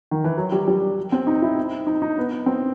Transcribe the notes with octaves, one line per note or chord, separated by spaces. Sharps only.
D#3
E3
F#3
G3
G3
C4
D#4
E4
D#4
D#4
B3
C4